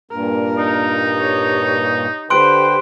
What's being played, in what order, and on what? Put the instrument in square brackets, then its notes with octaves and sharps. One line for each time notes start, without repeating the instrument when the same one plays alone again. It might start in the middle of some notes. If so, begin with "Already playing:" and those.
[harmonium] G2 A#2 [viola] A#4
[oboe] D#4
[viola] G4 C#5
[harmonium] D3 B4 G5 [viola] G4 C5 [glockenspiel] C6 F#6 D7